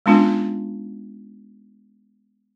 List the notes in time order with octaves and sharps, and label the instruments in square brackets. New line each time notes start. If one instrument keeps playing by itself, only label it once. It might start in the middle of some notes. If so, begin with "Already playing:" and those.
[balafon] G#3 B3 C#4 D4 F4